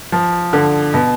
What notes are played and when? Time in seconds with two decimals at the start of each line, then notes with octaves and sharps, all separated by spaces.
0.12 F3
0.53 D3
0.94 B2